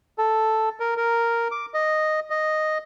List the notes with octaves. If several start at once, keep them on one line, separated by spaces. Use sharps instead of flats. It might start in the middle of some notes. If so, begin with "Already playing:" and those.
A4
A#4
A#4
D6
D#5
D#5